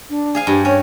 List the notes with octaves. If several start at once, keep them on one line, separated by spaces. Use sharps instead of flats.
D4
G#4 F5 G#5
G2 G4
C#4 C#5